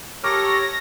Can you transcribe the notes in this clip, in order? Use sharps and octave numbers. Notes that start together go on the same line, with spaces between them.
G4 A4 A#4 C#5 C#6 D6 F6 A#6